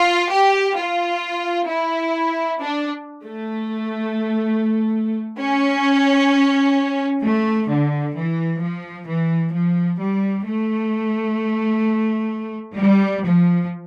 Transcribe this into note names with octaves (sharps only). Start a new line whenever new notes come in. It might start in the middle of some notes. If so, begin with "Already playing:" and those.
Already playing: F4
G4
F4
E4
D4
A3
C#4
A3
D3
E3
F3
E3
F3
G3
A3
G3
F3